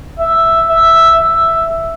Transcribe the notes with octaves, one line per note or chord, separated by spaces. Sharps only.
E5
E5
E5